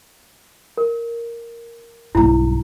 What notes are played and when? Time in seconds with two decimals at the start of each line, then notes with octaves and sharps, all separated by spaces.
0.77 A#4
2.15 B1 G2 E4 A#5